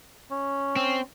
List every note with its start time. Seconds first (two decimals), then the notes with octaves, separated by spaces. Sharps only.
0.31 C#4
0.76 C4